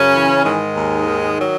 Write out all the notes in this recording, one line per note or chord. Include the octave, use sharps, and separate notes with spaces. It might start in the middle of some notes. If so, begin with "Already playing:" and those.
Already playing: F#2 C#3 C#4
E3
G#2 D#3 G#3
D#2
D#3
F#3